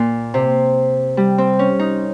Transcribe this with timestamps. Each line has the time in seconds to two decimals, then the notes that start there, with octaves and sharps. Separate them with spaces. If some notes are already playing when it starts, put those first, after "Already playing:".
Already playing: A#2
0.34 C3
1.17 G3
1.38 C4
1.59 C#4
1.79 D#4